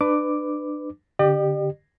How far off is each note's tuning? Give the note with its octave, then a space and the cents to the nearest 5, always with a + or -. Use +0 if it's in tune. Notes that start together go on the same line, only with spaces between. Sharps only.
D4 +30 B4 +20 D6 +0
D3 -20 G4 +0 D5 +45